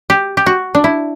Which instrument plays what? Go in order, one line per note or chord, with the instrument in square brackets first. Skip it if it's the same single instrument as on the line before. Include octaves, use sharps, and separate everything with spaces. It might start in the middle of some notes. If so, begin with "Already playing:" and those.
[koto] G4
G4
F#4
D4
E4